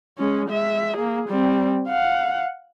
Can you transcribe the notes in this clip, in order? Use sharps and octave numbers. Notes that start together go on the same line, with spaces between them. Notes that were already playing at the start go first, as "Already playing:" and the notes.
G#3 C#4
G#3 E5
A#3 G#4
G3 C4
F5 F#5